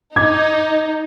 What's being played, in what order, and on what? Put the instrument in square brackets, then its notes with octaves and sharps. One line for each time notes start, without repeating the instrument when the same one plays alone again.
[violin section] D#4 [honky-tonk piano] D6 G#6